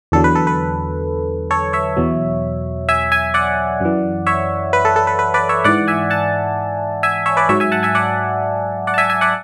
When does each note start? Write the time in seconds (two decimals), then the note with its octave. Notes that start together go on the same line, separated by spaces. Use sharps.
0.12 E2 D3 F#3 A4
0.24 B4
0.35 A4
0.47 B4
1.51 A4 C#5
1.73 C#5 E5
1.97 E2 B2 F#3
2.89 E5 G#5
3.12 E5 G#5
3.34 D5 F#5
3.81 F#2 E3
4.27 C#5 E5
4.73 B4
4.85 A4
4.96 A4
5.07 B4
5.19 B4
5.34 B4 D5
5.49 C#5 E5
5.64 G#2 E3 D5 F#5
5.88 E5 G#5
6.10 F#5 A5
7.03 E5 G#5
7.26 C#5 E5
7.37 B4 D5
7.49 G#2 F#3 C#5 E5
7.60 E5 G#5
7.72 F#5 A5
7.83 E5 G#5
7.95 D5 F#5
8.87 D5 F#5
8.94 A5
8.98 E5 G#5
9.10 E5 G#5
9.21 D5 F#5